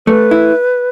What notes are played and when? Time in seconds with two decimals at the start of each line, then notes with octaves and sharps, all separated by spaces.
0.07 A3 B4
0.31 E4